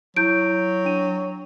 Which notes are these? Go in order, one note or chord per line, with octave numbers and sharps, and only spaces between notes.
F#3 E4 G6 D7
D4 D#7